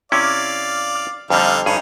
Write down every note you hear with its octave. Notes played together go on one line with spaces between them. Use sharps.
C3 C#4 E4 D5 F5
F2 D3 G3 D#4 F5
G2 C#4 D#4 G#4